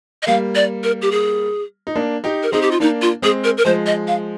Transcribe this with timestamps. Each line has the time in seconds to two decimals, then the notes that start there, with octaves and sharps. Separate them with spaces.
0.22 D#5
0.27 G3 A#3 F5
0.55 D5
0.83 A#4
1.02 G4
1.11 G#4
1.87 D#4
1.95 A#3 D4
2.24 D#4 G4
2.43 A#4
2.52 C4 D#4 G#4
2.62 G4
2.71 F4
2.80 A#3 D4 D#4
3.02 F4
3.22 G#3 C4 G#4
3.44 A#4
3.58 A#4
3.65 F3 G#3 C5
3.86 D#5
4.08 F5